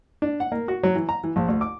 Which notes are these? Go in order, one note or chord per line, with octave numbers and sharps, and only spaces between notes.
D4
F#5
A#3
F#4
F#3
E3
A#5
E3
A#1
D2
D6